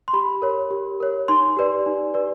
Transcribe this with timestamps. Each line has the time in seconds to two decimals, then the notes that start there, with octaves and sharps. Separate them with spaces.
0.08 C6
0.13 G4 B5
0.42 A#4 C#5
0.71 G4
1.00 A#4 C#5
1.28 D#4 C6
1.57 G4 B4 D5
1.86 D#4
2.14 G4 B4 D5